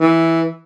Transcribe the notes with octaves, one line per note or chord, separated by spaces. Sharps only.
E3